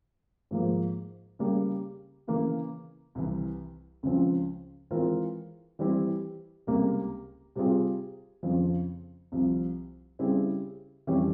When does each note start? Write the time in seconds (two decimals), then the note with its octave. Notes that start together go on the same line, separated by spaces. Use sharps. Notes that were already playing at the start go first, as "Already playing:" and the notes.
0.51 G#2 F3 A#3
1.39 C#3 G3 A#3
2.27 C#3 E3 A#3
3.15 C2 C3 E3
4.03 C#2 C#3 F3 C4
4.91 E3 G#3 C4 F4 A#4
5.79 E3 G3 C4 E4 G4
6.67 C#2 C3 G3 A#3
7.56 C3 G3 C4 F4 G#4
8.43 F2 C#3 F3
9.32 C2 C3 F3
10.19 C#3 G3 C4 E4 G#4
11.07 F2 E3 G3 C#4 G4